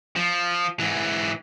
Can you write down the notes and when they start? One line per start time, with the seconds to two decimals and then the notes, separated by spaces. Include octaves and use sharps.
0.16 F3
0.80 G#2 E3